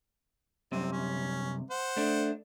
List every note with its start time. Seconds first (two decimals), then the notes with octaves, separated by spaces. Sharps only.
0.72 C2 F#2 C3 C4
0.92 C#4
1.71 C5 F#5
1.97 A3 D4